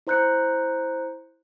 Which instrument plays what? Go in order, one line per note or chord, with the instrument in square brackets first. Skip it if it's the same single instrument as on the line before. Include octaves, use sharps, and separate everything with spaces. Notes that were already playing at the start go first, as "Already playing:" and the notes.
[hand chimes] E4 C5 A#5 F#6 G6 C#7